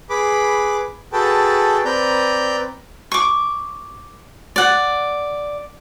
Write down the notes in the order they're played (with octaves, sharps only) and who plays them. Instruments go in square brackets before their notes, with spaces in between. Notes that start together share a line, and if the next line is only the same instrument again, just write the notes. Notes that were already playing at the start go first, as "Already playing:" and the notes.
[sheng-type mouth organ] G#4 B4 B5 D6
F#4 G#4 A4 B4 G5 A5
C4 B4 D5 A#5 G6
[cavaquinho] C#6 D6
D5 F#5